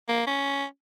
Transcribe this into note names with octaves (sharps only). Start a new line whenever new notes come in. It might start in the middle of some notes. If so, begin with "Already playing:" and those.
A#3
C#4